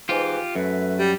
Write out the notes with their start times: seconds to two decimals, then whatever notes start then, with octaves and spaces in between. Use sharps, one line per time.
0.09 G#2 E3 F4 G4
0.55 F#2 A3 B4
0.97 G3